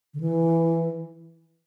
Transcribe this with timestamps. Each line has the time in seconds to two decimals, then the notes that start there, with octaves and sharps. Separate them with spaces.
0.14 D3
0.20 E3